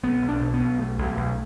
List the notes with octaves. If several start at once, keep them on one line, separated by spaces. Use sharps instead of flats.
B1 B3
B1
D4
B2
B3
B1
B1 A3
B1
B1